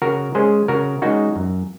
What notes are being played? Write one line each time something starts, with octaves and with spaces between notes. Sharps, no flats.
C#3 F#4 A#4
G#3 C#4 G#4 C5
C#3 F#4 A#4
G#3 C#4 D#4 F#4
F#2